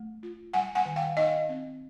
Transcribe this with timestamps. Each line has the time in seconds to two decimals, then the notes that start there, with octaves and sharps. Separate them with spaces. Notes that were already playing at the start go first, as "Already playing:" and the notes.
Already playing: A3
0.23 F4
0.53 G3 F#5 G#5
0.75 F#5 G#5
0.85 D#3
0.96 F5 G5
1.17 D#4 D#5 F5
1.49 C4